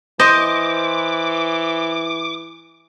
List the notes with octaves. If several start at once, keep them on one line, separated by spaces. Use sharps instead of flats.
E3 C5 D#5 D6